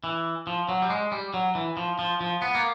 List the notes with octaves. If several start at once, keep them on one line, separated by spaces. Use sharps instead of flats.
E3
F3
F#3
G3
G#3
G3
F#3
E3
F3
F3
F3
B3
A#3